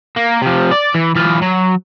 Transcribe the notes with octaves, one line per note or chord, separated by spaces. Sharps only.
A#3
C3 F3
D5
E3
E3 F4
F#3